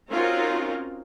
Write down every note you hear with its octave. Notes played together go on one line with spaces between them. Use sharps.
C4 C#4 D#4 F4 F#4 A#4